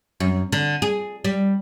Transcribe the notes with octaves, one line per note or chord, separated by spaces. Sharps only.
F#2
D3
G#4
G3